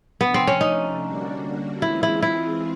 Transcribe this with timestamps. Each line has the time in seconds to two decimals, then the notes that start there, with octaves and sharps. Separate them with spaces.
0.21 C3 F3 A3 B3 D4
0.34 C4
0.47 C#4
0.61 D#4
1.02 D3 G3 A#3 D4 F#4
1.82 E3 G#3 C4 E4 F4 G#4
2.03 E4
2.22 E4